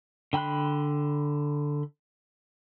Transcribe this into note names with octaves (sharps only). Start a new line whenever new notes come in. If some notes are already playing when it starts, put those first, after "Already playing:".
D3 G5 B5 C6 F#6